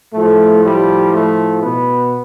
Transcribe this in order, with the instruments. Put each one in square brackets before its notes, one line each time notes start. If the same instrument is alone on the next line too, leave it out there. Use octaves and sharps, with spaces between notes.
[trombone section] A2 F3 A3
G3
A3
B2 B3